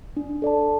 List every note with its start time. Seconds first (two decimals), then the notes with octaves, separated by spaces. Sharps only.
0.17 D4
0.42 A4 D5 A5